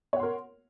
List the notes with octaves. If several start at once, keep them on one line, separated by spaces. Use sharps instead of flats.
A#4 C#5 F#5 C6